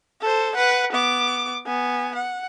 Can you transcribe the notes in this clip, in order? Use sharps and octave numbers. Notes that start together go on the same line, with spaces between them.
A4 C5
B4 F#5
B3 D6
B3 G#5
F#5